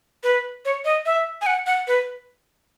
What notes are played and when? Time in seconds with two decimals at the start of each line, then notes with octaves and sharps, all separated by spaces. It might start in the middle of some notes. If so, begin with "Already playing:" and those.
0.24 B4
0.65 C#5
0.85 D#5
1.06 E5
1.42 G#5
1.46 F#5
1.66 F#5
1.88 B4